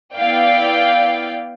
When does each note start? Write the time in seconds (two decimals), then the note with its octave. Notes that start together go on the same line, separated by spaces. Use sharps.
0.15 B3 E4 D5 F5 G5